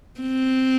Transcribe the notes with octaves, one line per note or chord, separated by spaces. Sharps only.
C4